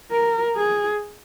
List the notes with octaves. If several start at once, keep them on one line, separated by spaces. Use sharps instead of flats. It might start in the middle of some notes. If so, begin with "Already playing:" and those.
A#4
G#4